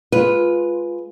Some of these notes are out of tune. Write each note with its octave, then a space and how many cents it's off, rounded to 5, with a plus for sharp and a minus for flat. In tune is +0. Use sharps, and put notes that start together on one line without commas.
G#3 +5 F4 +0 B4 +0